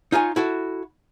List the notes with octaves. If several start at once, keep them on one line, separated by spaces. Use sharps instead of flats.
D#4 F4 C#5 G#5
E4 F#4 A4